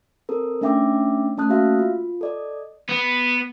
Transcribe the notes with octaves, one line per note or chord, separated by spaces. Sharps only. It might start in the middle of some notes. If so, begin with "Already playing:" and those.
C4 A4 A#4
A3 C#4 D4 E5 G5 D6
A3 C#4 A5 D#6 F#6
A#3 F#4 E5 F5
F4
A4 D5 D#5
B3